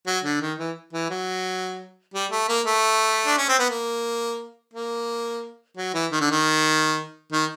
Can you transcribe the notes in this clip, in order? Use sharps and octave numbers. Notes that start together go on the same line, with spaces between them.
F#3
D3
D#3
E3
E3
F#3
G3
A3
A#3
A3
D4
C#4
C4
B3
A#3
A#3
F#3
E3
D#3
D3
D#3
D#3